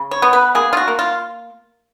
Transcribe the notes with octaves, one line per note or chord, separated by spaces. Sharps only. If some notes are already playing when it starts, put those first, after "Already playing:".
Already playing: C#3
C#5
B3
B4
A#3 G#4
F4
F#4
A#3
F4